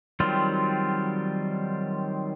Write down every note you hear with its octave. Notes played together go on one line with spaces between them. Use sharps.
D#3 F#3 G3 C4 F4